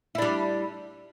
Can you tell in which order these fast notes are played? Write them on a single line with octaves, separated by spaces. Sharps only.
E4 D4 G3